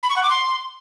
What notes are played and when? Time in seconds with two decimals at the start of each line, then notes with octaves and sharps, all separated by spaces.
0.03 B5
0.10 C#6
0.16 F#5
0.23 D6
0.30 C6